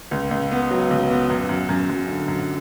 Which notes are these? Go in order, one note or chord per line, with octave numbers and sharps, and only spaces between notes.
C#2
C#2
B3
F#3
C#2
B3
F#2
F#2
F#2
F#2
D3
F#2